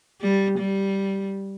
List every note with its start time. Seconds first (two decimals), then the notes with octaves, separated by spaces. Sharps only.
0.22 G3
0.58 G3